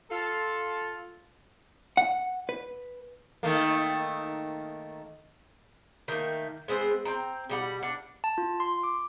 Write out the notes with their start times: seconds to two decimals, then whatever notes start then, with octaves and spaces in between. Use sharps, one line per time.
0.11 F4 A4
1.97 F#5
2.49 B4
3.43 D#3 A3 A#3
6.08 D#3 A3 A#3
6.68 G#3 B3 C4
7.05 C4 G5 A#5
7.49 B2 G3 F#5
7.83 D4 F#5
8.24 A5
8.38 F4
8.60 C6
8.84 D6